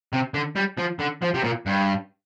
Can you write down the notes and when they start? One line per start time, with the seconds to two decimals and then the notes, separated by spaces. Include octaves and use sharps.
0.13 C3
0.34 D3
0.56 G3
0.78 F3
1.00 D3
1.22 F3
1.34 C3
1.44 A#2
1.66 G2